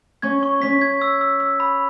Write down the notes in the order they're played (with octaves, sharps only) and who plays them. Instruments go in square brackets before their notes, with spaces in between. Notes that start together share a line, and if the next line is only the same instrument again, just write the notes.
[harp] C#4 [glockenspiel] G#6
[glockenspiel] C#6
[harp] C#4 [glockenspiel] B6
[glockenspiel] G#6
E6
E6
E6
B5